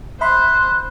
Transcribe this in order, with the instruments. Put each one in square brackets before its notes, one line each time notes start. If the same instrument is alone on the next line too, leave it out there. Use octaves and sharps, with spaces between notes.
[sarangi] C5 [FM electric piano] E5 B5 C6 [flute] F#6